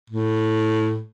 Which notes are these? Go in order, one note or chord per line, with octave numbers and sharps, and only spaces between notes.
A2